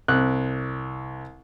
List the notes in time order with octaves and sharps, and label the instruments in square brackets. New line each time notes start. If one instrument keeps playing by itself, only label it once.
[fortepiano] C2 F#6